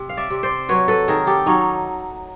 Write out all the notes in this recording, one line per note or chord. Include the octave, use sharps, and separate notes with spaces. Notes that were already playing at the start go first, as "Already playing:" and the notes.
Already playing: C3
F5
D5 E5
C3
C5 D5
F#3 B4 C#5
A4 B4
D#3 G#4 A#4
G4 A4
F#3 C#4 D#4